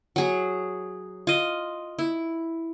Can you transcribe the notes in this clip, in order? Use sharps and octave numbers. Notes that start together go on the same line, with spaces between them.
F#3 G#4
F4 D#5
E4